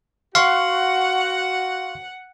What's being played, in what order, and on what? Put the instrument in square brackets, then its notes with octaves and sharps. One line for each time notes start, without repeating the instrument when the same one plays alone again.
[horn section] F#4 [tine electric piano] F5 C6 C#6 [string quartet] F#5